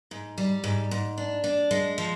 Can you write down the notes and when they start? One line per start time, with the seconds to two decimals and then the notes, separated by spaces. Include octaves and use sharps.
0.11 G#2
0.38 G3
0.64 G#2
0.91 G#2
1.18 D4
1.44 D4
1.71 G#3
1.98 F3